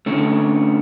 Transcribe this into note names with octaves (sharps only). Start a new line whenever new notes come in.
D3 A3 C#4